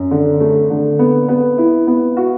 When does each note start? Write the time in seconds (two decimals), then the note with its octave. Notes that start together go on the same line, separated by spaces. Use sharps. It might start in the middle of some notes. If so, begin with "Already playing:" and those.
Already playing: F#2
0.11 D3
0.40 A3
0.70 D3
0.99 B3
1.28 B3
1.58 E4
1.87 B3
2.17 F#4